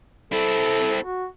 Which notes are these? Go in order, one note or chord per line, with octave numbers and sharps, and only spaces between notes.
C4 E4 A4
F#4